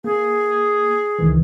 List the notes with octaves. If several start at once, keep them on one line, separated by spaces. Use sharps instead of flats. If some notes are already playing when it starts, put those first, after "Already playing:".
A#3 G#4
C#2 D#3 E3